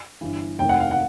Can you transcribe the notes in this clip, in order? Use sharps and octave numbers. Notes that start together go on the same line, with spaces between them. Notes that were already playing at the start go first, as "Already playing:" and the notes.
G1 G2 E3
F1 D#2 D#3 G5
F#5
F5
F#5